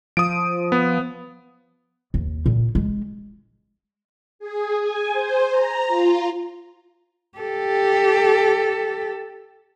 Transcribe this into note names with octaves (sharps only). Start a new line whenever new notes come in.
F3 D#6 D7
B3
D#2
A#2
G#3
G#4
G#5
C5
A#5
F4
G4 A4